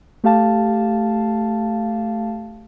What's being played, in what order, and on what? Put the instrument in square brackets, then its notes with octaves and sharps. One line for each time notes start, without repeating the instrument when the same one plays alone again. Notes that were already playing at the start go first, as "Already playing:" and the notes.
[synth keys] A3 G4 F5 A5